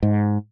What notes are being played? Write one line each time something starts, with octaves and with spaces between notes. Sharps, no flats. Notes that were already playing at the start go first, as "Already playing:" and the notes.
G#2